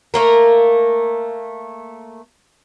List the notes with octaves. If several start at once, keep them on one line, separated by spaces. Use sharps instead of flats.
A3 A#3 A#4